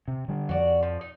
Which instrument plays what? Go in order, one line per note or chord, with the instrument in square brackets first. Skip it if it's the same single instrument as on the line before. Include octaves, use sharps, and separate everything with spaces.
[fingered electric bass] C3
D3 G3
[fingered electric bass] F2 [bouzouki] F#4 D5
[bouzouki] F3
D#4